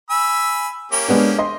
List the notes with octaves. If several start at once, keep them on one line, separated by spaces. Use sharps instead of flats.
G#5 B5 E6
A#3 C#4 G4
G#3 B3 D4
D#5 C6